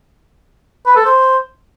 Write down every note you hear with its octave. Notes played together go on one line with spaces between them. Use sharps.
B4
A4
C5